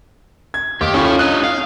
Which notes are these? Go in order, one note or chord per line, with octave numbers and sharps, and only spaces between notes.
G#6
D#2 G4
C#4 F4 A4 C#5
D4 D#5 F#6
F5